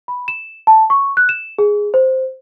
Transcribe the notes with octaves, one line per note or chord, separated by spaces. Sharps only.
B5
E7
A5
C#6
F#6
E7
G#4
C5